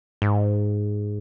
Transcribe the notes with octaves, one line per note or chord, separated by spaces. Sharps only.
G#2